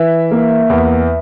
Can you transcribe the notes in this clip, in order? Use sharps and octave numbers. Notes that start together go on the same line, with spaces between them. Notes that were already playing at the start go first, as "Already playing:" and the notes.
Already playing: E3 E5
A#3
E2